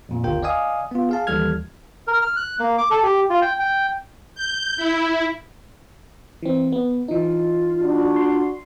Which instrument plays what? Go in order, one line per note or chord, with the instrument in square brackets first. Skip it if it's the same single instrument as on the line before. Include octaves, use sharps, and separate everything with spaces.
[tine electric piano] F2 A#2
G1 D#2 F4 A#4 G5
D5 D#5 F5 G#5 D#6
B3 F4
G#4 F5 A5
D#2 E3 G3 A4 F6 G#6
[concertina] A#4
F6
F#6
A#3
D6
A4
G4
F4
G5
G5
[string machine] G6
E4
[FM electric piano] E3 C4
B3
[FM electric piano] E3 D#4 [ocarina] F4
[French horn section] D4 F#4
[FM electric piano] C6